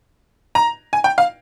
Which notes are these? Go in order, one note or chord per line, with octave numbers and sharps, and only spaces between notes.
A#5
G#5
G5
F5